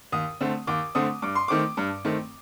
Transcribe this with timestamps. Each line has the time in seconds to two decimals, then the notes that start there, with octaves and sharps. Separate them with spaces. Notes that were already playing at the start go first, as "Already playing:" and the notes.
0.12 D#2 D#6
0.41 D3 A3 C4
0.67 D#2 D6
0.95 D3 A3 C4 D#6
1.22 G2 D6
1.35 C6
1.48 D#3 A3 C4 D6
1.77 G2
2.05 D#3 A3 C4